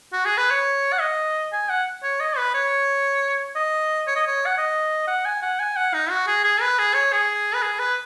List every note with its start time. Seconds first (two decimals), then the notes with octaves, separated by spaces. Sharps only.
0.13 F#4
0.25 G#4
0.37 B4
0.50 C#5
0.93 F#5
1.00 D#5
1.52 G#5
1.69 F#5
2.03 C#5
2.20 D#5
2.37 B4
2.54 C#5
3.56 D#5
4.07 C#5
4.16 D#5
4.27 C#5
4.46 F#5
4.58 D#5
5.08 F#5
5.25 G#5
5.42 F#5
5.59 G#5
5.76 F#5
5.94 D#4
6.10 F#4
6.27 G#4
6.44 G#4
6.61 B4
6.79 G#4
6.94 C#5
7.12 G#4
7.55 B4
7.62 G#4
7.79 B4